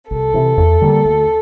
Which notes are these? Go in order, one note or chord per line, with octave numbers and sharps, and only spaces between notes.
C2 A4
C3 E3
E2
D3 G3 A#3
D2